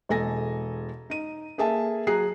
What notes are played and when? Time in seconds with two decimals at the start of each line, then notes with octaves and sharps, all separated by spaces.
0.09 E1 G#3 A4 G#5 A#6
1.10 D#4 D#7
1.58 A#3 G#4 A4 E5 G#5 A5
2.07 F#3 G#4 A#5 F#6 C7